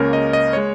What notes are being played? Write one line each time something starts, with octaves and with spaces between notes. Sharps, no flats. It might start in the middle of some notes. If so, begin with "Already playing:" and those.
Already playing: C#2 C#3 A#3 C#4 A#4
D#5
D#5
G#3 C#5